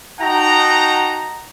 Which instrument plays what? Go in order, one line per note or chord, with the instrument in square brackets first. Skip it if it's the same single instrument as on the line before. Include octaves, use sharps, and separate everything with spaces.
[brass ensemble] D#4 F#4 F#5 G5 A5 A#5